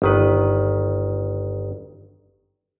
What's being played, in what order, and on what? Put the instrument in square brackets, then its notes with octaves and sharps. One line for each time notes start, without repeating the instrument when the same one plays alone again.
[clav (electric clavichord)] G1 D#3 B4